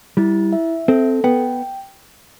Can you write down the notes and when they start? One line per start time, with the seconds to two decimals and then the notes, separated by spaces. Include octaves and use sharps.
0.17 G3 E4
0.53 E5
0.88 C4 A4
1.24 B3 G5